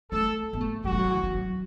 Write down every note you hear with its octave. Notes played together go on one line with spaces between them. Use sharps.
A3 A4
B3
A3
F#3 F#4
A3
F#3
E3
E3
F#3